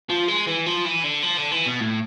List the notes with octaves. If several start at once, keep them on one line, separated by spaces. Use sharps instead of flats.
F3
G#3
E3
F3
E3
D3
F3
D3
E3
B2
A2